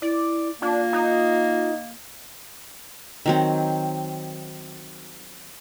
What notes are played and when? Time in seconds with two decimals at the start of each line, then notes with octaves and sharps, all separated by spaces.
0.02 E4 D5
0.62 A#3 D4 F4
0.93 D#4
3.26 D#3 F#3 C4